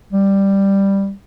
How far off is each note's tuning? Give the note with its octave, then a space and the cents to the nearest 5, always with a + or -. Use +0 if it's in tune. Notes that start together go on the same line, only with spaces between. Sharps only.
G3 +5